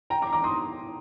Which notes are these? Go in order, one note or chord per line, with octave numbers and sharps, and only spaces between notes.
G5 A#5
A#5 D6
A#5 D6
C6 D#6